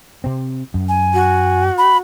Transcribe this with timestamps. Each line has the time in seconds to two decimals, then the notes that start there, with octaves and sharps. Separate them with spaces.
0.24 C3 C4
0.74 F#2
0.89 G#5
1.13 F#4
1.78 B5